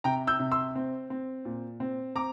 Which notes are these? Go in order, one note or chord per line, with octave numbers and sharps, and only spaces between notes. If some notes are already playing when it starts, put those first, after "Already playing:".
C3 G5 A#5
E6 G6
C3
C6 E6
C4
C4
A#2
C4
C4 A#5 D6